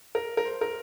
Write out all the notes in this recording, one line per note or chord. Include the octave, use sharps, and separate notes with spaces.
A#4
A#4
C5
A#4